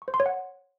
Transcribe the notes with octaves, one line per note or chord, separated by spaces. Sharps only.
C#6
C5
C6
C#5
F#5